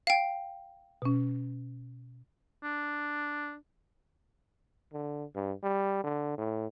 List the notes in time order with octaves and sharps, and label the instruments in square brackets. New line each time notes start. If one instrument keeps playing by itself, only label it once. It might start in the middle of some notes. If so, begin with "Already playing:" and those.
[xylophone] F5 G5
[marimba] B2 C#4
[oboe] D4
[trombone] D3
G2
G3
D3
A2